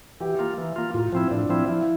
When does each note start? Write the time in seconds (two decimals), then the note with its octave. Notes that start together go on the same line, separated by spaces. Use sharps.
0.20 E3 G4
0.39 A#3 F4
0.58 E3
0.76 A#3 F4
0.94 A2 F4
1.12 F3 C4 E4
1.31 A2 D4
1.49 F3 C4 E4
1.68 F3 E4